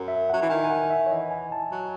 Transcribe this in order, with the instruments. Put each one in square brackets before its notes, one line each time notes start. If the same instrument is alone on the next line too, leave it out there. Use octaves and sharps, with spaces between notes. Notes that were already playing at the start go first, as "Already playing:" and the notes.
Already playing: [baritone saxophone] F#2
[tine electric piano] E5
F#5
[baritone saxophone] F#3
E3
[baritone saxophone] D#3 [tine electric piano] G#5
[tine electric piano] G#5
F#5
E5
C#5
[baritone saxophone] E3 [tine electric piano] D#5
[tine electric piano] G#5
A5
[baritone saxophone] F#3